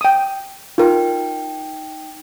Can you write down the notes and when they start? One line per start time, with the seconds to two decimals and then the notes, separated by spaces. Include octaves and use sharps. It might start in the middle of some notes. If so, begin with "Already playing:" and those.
0.01 G5 D#6
0.78 D#4 F4 A#4 G5